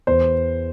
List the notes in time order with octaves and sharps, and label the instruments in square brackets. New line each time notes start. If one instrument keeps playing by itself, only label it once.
[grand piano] E2 C5